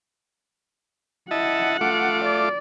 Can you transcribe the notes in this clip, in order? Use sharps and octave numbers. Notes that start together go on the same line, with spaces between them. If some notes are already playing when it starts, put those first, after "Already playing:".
E4 D#5 F#5 A5
A3 F4 D6
D5